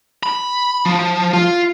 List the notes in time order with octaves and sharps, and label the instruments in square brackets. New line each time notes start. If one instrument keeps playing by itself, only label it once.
[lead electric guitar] B5
F3
F4